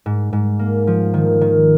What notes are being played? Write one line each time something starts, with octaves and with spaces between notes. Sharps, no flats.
G#2
G#2
A#3
F3
D#3
D#3